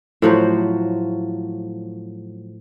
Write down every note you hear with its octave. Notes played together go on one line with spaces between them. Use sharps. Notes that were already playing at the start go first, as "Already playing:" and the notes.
A2 F3 F#3 C5